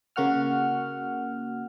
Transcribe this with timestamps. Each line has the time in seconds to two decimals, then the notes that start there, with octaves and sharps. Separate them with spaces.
0.16 C#3 A#3 F#4 F#5 F6